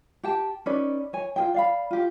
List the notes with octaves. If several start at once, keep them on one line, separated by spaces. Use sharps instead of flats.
G4 G5 A5
C#4 D#4 B4 D5
C#5 G#5
F4 G#4 G5
D5 F5 B5
F4 G4